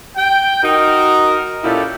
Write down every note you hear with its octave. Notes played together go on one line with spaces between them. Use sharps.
G5
D#4 F#4 A#4
A#2 C#4 E4 F4 G4 A4